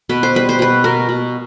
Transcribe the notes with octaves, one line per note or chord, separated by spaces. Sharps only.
B2 B4
C5
G3 B4
C5
B2 B4
B2 A#4
B2